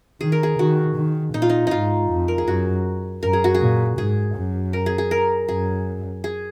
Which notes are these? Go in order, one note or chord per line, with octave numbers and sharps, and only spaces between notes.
D#3 G#4
A#4
G#4
D#3 F#4
D#3
A#2 D#4
F4
D#4
G#2 D#4 F4
F2
A#4
G#4
F#2 F#4
F#2 A#4
G#4
F#4
G#4
A#2
G#2 G#4
F#2
A#4
G#4
G#4
A#4
F#2 G#4
G#4